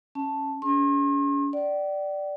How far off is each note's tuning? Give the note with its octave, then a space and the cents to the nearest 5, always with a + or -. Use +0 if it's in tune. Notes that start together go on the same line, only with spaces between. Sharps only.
C#4 -10 A5 +0
C#4 +40 G#4 +0 C6 +45
D5 +0 G5 -45